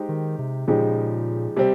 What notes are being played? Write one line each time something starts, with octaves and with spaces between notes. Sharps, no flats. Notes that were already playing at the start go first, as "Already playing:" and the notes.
Already playing: G#3 D#4 G4 C5
D#3
C3
A#2 C#3 F3 G#3 D#4 G4
C3 G3 C4